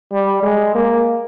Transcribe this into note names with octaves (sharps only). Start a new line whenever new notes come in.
G3
G#3
A#3